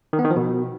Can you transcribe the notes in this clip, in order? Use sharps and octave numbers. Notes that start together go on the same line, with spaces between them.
D#3
B3
D#3
F3
B2